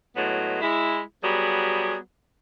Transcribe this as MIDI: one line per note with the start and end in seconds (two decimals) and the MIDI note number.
0.16 0.59 45
0.16 0.59 54
0.16 0.59 56
0.16 0.59 59
0.61 0.99 56
0.61 0.99 64
1.23 1.95 54
1.23 1.95 55
1.23 1.95 59
1.23 1.95 68